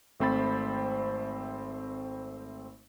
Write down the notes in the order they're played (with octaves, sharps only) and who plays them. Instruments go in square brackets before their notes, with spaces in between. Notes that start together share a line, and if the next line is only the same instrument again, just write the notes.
[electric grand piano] G#1 A3 C4 C5 B5 A6